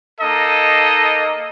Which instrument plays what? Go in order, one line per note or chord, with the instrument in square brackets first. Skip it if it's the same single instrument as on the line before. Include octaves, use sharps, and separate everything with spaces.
[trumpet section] A#3 D#4 A4 D#5